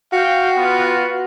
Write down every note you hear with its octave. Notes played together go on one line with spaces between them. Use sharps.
F#4 F5 G5
B3 F4